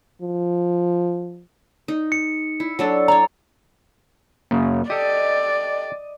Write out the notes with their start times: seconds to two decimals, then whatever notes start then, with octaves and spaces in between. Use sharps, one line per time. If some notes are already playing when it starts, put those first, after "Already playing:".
0.22 F3
1.88 D#4
2.12 C#7
2.60 E4
2.79 F#3 D4 A4
3.08 C#5 D5 A#5
4.51 F#2 C#3 A#3
4.90 G4 A4 D5 D#5